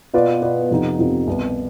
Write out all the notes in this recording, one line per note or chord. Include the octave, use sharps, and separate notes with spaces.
B2 B3 F4 B4 D5
B2 B3 F4 B4 D5
F2 C3 F3 B3 D#4
F2 C3 F3 B3 D#4
C2 B2 B3